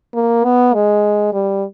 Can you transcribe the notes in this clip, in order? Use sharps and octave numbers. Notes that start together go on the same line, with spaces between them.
A#3
B3
G#3
G3